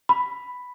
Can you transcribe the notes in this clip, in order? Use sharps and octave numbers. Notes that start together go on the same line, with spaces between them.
B5